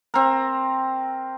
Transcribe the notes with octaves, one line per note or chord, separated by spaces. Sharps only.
C4 A#4